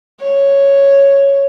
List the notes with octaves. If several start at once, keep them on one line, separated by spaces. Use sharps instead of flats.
C#5